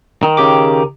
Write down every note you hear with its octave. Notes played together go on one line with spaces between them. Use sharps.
D#3
C#3 G4 D6